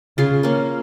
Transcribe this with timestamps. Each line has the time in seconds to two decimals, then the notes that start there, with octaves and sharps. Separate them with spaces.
0.18 C#3 F4 G#4
0.43 A#3 C#4